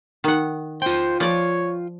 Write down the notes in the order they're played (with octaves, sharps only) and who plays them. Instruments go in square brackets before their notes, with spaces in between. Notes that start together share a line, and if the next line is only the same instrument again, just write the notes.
[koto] D#3 F#5
[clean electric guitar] F4 G5 [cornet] C5
[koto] F3 D5 [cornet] C#5